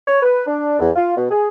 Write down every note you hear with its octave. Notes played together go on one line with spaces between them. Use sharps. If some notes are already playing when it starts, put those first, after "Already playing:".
C#5
B4
D4
E2
F4
B2
G#4